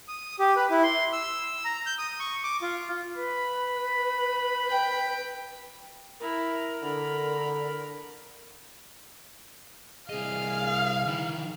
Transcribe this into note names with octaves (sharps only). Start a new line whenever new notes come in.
D#6
G4
B4
E4
C6
E6
A#5
G6
D#6
C#6
D6
F4
B4 B5
G5
E4 A#4
D3 B5
C2 G#4 D#5 F5
D#3 E3